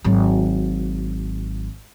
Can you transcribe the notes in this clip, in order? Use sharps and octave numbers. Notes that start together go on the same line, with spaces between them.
G#1 F#3